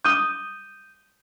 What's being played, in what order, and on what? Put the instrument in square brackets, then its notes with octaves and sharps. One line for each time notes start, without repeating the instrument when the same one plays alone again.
[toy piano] D6 D#6 [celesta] G6 D#7 G7